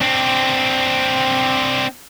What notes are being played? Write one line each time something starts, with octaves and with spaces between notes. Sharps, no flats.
C4 D4